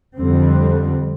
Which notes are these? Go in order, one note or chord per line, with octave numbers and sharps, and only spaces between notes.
F2 D3 G3 C4